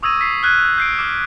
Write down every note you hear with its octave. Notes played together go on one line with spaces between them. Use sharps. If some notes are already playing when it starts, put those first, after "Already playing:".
C#6 D#6 E6 G#6 A#6 D#7
B6 C7
F6 F#6 G#6 D#7
G6 C7 D7
D6 F6 D7